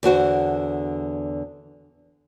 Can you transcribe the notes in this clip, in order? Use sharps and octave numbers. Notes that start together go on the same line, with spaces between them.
E2 D3 F#4 C5